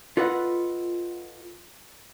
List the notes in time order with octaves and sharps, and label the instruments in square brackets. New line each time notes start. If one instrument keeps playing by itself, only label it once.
[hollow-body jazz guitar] F4 A4 B4 D#5 F#5